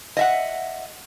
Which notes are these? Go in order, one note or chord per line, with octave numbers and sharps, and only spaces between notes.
D#5 E5 F#5